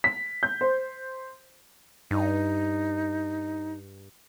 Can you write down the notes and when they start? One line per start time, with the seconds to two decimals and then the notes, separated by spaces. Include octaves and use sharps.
0.04 B6
0.43 G6
0.61 C5
2.11 G2 D#4